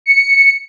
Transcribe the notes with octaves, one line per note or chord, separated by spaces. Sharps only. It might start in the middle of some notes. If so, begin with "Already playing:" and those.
C#7